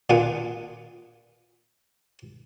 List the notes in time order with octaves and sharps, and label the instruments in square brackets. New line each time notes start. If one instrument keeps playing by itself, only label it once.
[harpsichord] A#2 B3 D4 F4 F#5 G#5